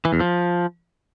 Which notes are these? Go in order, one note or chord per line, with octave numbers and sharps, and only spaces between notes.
E3
E2
F3